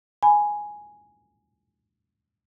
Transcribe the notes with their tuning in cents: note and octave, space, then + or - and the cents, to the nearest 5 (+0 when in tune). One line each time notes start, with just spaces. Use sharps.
G#5 +0 B5 +0